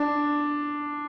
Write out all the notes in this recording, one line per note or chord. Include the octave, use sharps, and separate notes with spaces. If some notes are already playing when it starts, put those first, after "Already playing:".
Already playing: D4